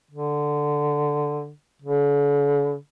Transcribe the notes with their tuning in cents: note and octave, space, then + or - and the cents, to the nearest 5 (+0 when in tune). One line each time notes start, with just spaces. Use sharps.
D3 +5
D3 -45